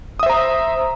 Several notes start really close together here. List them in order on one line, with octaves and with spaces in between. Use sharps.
D#6 E5 C5 A#5